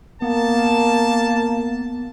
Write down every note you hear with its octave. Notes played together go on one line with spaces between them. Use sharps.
A#3 B3 A5